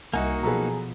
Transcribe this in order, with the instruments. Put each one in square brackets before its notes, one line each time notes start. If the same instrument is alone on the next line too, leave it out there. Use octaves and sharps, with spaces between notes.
[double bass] C2 [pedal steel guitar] A#3 D#4 F#4 [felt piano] D#5 E5 F#5 [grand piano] G#5
[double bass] B2 F3 [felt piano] F#3 A4 B4 [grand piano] G#4 A#5